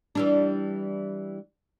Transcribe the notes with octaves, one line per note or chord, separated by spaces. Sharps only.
E3 G3 D4